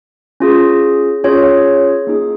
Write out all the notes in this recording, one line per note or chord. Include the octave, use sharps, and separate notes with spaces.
C#4 F4 G#4
C#4 F4 G#4 C#5
A#3 D#4 G#4